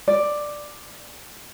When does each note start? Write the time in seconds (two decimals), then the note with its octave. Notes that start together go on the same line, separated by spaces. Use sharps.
0.08 D5